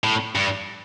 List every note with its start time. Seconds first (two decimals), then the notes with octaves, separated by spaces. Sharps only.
0.04 A2
0.35 G2